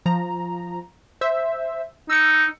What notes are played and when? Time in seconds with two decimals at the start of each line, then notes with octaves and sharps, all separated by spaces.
0.06 F3 A#5
1.21 C5 E5
2.10 D#4 E6 C#7